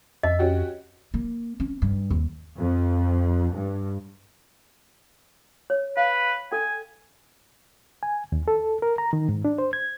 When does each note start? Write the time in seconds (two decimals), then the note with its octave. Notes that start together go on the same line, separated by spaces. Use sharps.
0.23 F2 D#5 E5
0.39 C#4 F#4 G4
1.14 A#3
1.60 C#4
1.82 G2
2.10 D#2
2.59 F2
3.54 G2
5.70 C#5
5.97 B4 F5
6.52 A4 G5 G#5
8.03 G#5
8.32 D#2
8.48 A4
8.82 A#4
8.98 A#5
9.13 D#3
9.29 G#2
9.45 D4
9.58 C5
9.73 G#6